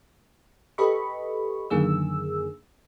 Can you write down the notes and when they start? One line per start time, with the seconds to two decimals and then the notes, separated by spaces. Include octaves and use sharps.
0.78 G4 A4 B4 D#5 B5 C#6
1.70 F#2 D3 D#3 A#3 G#4 E6